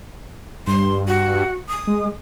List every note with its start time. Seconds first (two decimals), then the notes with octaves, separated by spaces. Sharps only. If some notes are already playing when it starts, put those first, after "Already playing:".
0.67 G2 C6
1.08 F#4
1.69 D#6
1.87 G#3